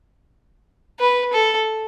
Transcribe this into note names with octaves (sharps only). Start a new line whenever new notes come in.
B4
A4